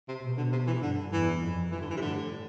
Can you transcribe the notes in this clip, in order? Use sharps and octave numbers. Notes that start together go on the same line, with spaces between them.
C3
B2
D3
C3
E3
G2 D3
E2 E3
F2
G2 E3
D3
E3
C3
A2 D3